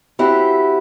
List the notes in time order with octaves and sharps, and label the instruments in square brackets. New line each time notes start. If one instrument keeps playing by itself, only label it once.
[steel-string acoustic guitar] C4 E4 F#4 G4